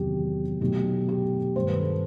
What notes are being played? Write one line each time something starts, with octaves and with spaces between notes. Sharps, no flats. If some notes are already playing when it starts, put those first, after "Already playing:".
Already playing: E2 C3 D#3 F#3 G4
B2 F#3 A3 D#4 G4
G4
G2 D#3 A3 C5
B4
A4